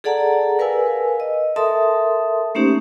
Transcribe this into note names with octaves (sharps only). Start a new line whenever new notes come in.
G#4 A4 D5 F#5 A5 A#5
A#4 B4 F5 G#5 E6
D#5
A4 A#4 E5 A5 C6 D#6
A3 A#3 C#4 D#4 G4 C5